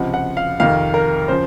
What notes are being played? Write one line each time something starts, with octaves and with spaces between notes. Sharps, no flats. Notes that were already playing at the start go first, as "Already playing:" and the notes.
Already playing: C#2 C3 F3 F#5
F#5
F5
F2 C3 D#3 F5
A#4
C#3 F3 C5